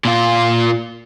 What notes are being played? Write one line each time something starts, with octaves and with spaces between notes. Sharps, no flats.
A#2 F4